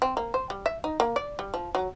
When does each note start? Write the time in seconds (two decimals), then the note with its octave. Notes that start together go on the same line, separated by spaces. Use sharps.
0.02 C4
0.17 A#3
0.34 C5
0.50 G3
0.66 E5
0.84 D#4
1.00 A#3
1.16 D5
1.39 G3
1.54 F3
1.75 F#3